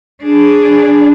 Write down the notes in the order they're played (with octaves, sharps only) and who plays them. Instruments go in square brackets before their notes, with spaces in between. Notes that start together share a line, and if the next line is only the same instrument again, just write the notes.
[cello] D4 G#4